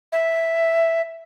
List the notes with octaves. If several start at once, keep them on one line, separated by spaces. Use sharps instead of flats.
E5